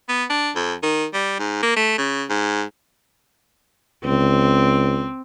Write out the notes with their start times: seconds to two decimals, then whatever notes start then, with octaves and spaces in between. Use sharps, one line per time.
0.09 B3
0.30 D4
0.55 F2
0.83 D#3
1.14 G3
1.39 G#2
1.63 A#3
1.76 A3
1.98 C#3
2.29 G#2
4.05 C#2 C4